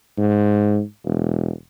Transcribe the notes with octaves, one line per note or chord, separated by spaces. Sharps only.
G#2
E1